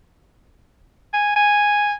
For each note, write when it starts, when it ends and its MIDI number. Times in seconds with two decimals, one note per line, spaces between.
1.14 1.32 80
1.36 1.93 80